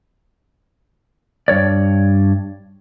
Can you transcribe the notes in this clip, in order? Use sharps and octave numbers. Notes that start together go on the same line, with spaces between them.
G2 C#5 D5